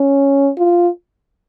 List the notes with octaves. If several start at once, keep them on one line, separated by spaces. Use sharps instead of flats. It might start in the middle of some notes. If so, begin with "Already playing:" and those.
Already playing: C#4
F4